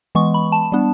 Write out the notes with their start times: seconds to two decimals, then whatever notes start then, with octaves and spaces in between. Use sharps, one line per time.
0.15 E3 G#3 B3 C#6
0.34 B5
0.52 A5
0.72 G3 B3 D4